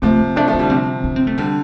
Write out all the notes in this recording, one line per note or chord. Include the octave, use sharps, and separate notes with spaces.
C3 F3 A3
C4
F3 A3 D4
F3 A3
D4
D3 G3
C3 F3 C4
D4
C4
A3
D3 G3